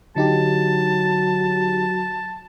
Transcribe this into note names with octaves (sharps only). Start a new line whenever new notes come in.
D3 F#3 D#4 G4 A5